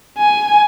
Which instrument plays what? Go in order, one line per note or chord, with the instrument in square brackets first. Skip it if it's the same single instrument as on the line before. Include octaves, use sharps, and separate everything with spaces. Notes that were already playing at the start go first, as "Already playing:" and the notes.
[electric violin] G#5